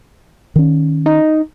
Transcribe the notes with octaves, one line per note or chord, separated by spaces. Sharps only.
D#3 C#4
D#4